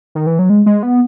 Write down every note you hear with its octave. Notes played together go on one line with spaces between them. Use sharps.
D#3
E3
F#3
G#3
G#3
B3